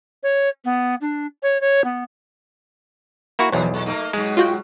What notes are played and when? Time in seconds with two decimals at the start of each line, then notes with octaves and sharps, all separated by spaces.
0.23 C#5
0.65 B3
1.01 D4
1.43 C#5
1.61 C#5
1.84 B3
3.39 A#3 E4 F#4
3.52 B1 E2 E3 F#3
3.74 A#2 A4
3.86 A3 A#3 D#4
4.13 G#2 B2 F#3 G#3
4.37 F4 F#4 G5